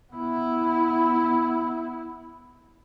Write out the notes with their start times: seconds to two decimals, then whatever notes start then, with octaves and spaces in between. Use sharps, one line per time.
0.13 B3 E4